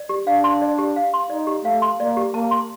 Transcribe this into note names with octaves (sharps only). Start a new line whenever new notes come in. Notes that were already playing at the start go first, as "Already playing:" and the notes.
Already playing: D5
G4
D4 F5
C6
D5
G4
F5
C6
D#4 D5
G4
A3 F5
C6
A#3 D5
G4
A#3 A5
C6